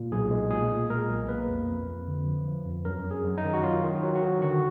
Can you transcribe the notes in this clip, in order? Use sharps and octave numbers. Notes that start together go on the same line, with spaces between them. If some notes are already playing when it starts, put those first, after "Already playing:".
Already playing: A#2
B1 G#4
G#3
A#2 G#4
A#2
G#3 A#4
B1
A#3 B4
F2
F2
F2
D3
F3
F3
F2
F#2 A#4
F#2
G#4
F#2
D#4
D#3
F#4
F#3 F4
D#3
F#3
F#4
D#3
D3 F#4